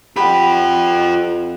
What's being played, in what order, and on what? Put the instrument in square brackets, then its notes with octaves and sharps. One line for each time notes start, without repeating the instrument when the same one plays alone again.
[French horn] F2 [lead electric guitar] F4 G5 [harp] G4 F#5 [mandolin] B5